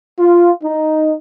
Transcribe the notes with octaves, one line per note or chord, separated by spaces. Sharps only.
F4
D#4